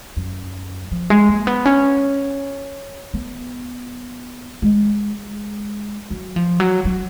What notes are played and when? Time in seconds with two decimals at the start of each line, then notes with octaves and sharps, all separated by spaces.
0.17 F#2
0.91 F3
1.10 G#3
1.29 A#3
1.47 B3
1.66 C#4
3.14 B3
4.62 G#3
6.10 F#3
6.36 F3
6.60 F#3
6.85 F#3